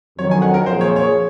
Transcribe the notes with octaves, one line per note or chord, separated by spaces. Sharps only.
F2 D#3 F#3 C#5
G#5
F#5
A#4
A#2 F3 C4 F4 G#4 C5
C#5
C#5